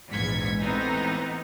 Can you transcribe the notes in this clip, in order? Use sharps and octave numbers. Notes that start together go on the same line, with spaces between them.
A#1 E2 G#2 G#6 B6 C#7
A2 E3 B3 C4 D#4